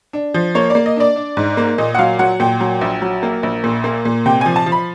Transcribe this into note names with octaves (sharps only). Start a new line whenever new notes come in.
D4
F3
A#3 C#5
A#3 D5
D#5
D4 D5
D4
G#2
A#3
A#2 D#5
F#5
F#3 F5
F#3 F#5
A#2 G5
F#3
A#1
F#3
A#3
A#1
A#2
A#3
A#2
C3 G5
F3 G#5
A5
F3
B5